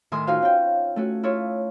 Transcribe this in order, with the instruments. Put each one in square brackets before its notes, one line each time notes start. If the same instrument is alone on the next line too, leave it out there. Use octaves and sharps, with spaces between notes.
[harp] A2 D#3 E5 G#5 C6 D#6
D#4 F4 F#4 C5 F5 G#5
C#4 G5
A3 C#4 F#4
E4 F4 A4 C#5